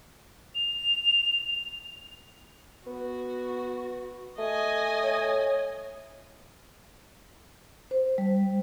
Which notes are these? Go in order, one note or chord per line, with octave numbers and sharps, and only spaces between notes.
F7
B3 F#4
A3 D#5 G#5
C#5
C5
G3